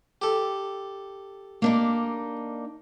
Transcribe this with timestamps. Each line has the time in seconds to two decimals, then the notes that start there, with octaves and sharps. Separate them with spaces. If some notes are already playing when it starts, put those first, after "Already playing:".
0.22 G4 A4
1.62 A#3 D4 D#4